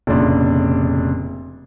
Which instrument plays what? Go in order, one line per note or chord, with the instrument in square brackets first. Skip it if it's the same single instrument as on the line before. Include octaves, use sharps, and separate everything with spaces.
[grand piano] F1 A#2 C#3 D4